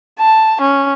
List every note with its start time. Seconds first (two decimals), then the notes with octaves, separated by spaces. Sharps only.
0.19 A5
0.61 C#4